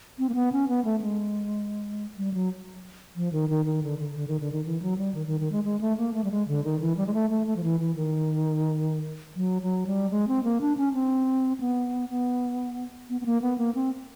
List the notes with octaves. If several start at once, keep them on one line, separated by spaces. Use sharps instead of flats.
C4
A#3
B3
C#4
B3
A3
G#3
G3
F#3
F3
D#3
D#3
D#3
D3
D3
D3
D#3
D3
D#3
E3
F#3
G3
D#3
D#3
D#3
G#3
G#3
A3
A#3
A3
G3
G#3
D3
D#3
E3
G3
G#3
A3
A3
A3
F3
E3
E3
D#3
F#3
F#3
G3
G#3
C4
A#3
D4
C#4
C4
B3
B3
B3
B3
A#3
B3
A#3
C4